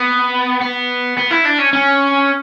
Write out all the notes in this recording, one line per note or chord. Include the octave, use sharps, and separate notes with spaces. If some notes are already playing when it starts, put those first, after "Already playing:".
Already playing: B3
B3
B3
E4
D4
C#4
C#4